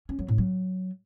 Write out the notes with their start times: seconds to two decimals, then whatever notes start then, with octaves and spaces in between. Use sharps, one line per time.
0.09 C#4
0.19 F#3
0.28 A2
0.38 F#3